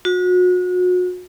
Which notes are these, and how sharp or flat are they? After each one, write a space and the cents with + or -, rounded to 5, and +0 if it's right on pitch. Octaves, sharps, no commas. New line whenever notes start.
F#4 -35